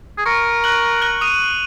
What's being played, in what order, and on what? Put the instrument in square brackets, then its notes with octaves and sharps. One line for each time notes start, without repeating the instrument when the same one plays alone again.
[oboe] G#4
[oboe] A#4 [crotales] C#6 C#7
[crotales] F#6 F#7
F#6 F#7
D#6 D#7